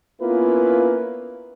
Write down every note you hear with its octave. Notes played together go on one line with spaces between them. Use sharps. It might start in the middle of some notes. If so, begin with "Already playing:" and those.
A#3 B3 C#4 E4 F4 B4